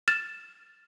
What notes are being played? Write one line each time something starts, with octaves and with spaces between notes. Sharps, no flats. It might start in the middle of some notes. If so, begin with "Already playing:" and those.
F6 A6 E7